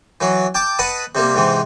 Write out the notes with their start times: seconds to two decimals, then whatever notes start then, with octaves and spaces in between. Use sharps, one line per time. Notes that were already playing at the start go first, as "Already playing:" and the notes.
0.21 E3 F#3
0.55 G5 A5 D6
0.79 B4 D#5 F#5 A5 B5
1.15 C3 G3 A#3
1.35 G#2 C3 E3